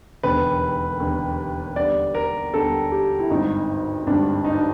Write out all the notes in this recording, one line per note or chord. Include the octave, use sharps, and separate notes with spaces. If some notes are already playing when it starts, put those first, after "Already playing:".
E1 D#2 D3 B4
E1 D#2 D3
D#2 D3 G3 B3 D5
A#4
D#2 D3 G3 B3 A4
G4
E4
G#1 G2 D3 D#4
G#1 G2 D3 D4
D#4
D4